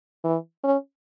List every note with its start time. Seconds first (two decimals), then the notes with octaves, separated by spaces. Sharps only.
0.24 E3
0.63 C#4